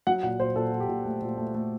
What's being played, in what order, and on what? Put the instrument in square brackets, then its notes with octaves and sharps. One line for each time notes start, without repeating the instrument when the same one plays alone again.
[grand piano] F#3 F#5
A#2 F#5
A#2 C5
A#2 A4
A#2
G4
A#2
A3
A#2
A3
A3